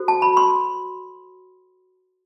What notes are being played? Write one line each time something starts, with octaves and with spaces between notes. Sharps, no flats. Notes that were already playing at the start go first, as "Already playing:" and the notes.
Already playing: F#4 A4 C5
A5
B5
C6